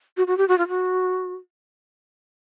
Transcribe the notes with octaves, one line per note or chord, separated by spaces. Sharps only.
F#4
F#4
G4
F#4
F4
F#4